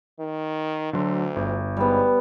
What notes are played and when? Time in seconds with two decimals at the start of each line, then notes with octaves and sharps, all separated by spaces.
0.19 D#3
0.93 D2 D3 F#3 C6
1.36 G1
1.77 G#2 G3 B3